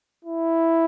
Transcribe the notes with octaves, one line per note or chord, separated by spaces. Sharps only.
E4